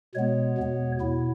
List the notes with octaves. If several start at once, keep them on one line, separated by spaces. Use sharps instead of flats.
B2 G#3 B3 C#5
E2 B2 B3
B2 E4